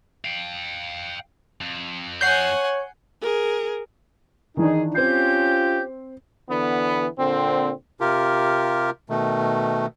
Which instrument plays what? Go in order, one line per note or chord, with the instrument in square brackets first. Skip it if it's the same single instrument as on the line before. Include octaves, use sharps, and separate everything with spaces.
[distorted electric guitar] F5 G5
F2
[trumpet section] C#5 [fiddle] F#5 G#5 [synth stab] G6 C7
[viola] G#4 A#4
[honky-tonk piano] D#3 E3 D4 [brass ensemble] D#4 G#4
[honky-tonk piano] C4 C7 [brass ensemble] C#4 F4 G4 [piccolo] G6
[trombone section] D3 E3 B3
A#2 D3 C4
[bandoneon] C3 F4 G4 A#4
B2 D#3 A3